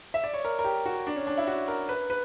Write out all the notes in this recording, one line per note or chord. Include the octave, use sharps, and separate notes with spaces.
E5
D5
C#5
A#4
A#4
G4
F#4
D4
C#4
D4
E4
F#4
A#4
B4
B4